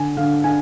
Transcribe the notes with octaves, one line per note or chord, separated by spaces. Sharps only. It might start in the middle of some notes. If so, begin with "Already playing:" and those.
Already playing: D3 G#5
D3 F5
D4 G#5